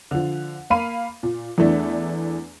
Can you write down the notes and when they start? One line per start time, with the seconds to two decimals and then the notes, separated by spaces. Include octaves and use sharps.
0.11 D3 F3
0.70 A#3 F5 B5 D#7
1.23 A#2
1.58 E2 E3 A3 D4